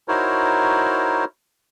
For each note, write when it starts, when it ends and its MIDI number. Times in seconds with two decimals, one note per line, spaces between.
0.08 1.25 63
0.08 1.25 64
0.08 1.25 66
0.08 1.25 70
0.08 1.25 72
0.08 1.25 73